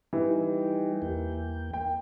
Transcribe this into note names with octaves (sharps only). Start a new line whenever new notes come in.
E3 G3 D#4 G4
E2 A#3 G5
G5